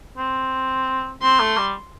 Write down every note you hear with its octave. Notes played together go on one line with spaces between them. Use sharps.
C4
C4 C6
A3
G3